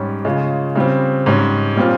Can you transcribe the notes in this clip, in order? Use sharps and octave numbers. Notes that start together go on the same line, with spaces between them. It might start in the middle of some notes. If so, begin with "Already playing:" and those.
Already playing: G#2 G3 C#4
C#3 G#3 C#4 F4
C#3 G3 C4
G#2 G3 C#4
A#2 G3 C4 F4